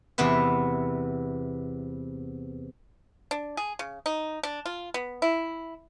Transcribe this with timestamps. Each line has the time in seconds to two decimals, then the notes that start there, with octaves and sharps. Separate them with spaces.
0.18 E2 C3 B3 B4 E5
3.31 D4
3.57 G#4
3.79 C#3
4.06 D#4
4.43 D4
4.66 F4
4.94 B3
5.22 E4